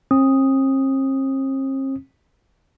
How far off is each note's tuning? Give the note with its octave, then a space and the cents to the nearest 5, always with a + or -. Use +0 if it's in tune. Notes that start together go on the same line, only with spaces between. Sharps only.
C4 +45 D#6 +0